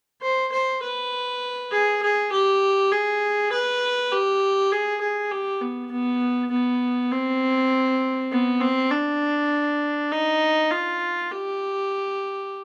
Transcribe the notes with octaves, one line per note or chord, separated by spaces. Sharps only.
C5
C5
B4
G#4
G#4
G4
G#4
B4
G4
G#4
G#4
G4
B3
B3
B3
C4
B3
C4
D4
D#4
F4
G4